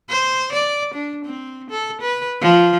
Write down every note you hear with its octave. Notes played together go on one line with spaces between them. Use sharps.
C5
D5
D4
C4
A4
B4
F3